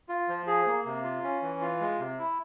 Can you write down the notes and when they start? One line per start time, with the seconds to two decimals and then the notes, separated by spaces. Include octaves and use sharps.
0.09 F4
0.29 F3
0.47 G#4
0.66 A#3
0.85 C3
1.04 F4
1.24 C#4
1.42 E3
1.61 F4
1.80 G#3
1.99 C3
2.18 E4